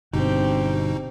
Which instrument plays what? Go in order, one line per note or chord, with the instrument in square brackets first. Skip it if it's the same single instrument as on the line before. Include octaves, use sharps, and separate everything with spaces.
[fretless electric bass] G1 G2 [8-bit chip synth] B2 D#4 [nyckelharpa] C4 G4